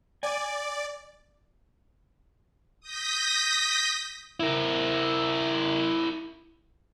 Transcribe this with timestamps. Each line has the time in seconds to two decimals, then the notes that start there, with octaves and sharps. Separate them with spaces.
0.23 D5 G#5
2.80 D#6 G6 A#6 B6
4.40 E4 A#4